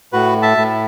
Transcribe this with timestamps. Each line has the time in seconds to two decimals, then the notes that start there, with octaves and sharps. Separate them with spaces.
0.13 A2 F#4 B4
0.42 E5 A5
0.57 A2